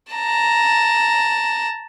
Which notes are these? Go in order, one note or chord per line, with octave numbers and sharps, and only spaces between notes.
A5 A#5